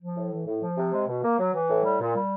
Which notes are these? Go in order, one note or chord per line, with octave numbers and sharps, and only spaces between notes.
F3
A2
E3
A2
F3
C3
G#3
B2
A#3
F#3
E3
A2
G3
A#2
G3